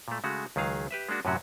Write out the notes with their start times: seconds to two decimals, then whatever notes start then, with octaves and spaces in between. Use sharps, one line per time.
0.08 A#2 A3
0.24 C#3 G#3 A3 F#4
0.56 C#2 D#3 F#3 G#4 F5
0.91 G4 B4 E5
1.09 G#3 A#3 D4 F#4
1.25 F#2 A2 C3 F#3 C#4 F#4